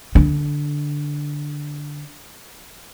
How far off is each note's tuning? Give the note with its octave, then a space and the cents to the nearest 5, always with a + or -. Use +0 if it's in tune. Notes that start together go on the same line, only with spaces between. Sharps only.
D3 +0 D4 +0